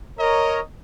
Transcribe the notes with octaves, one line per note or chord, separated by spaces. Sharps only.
A#4 C#5 D#5 A#5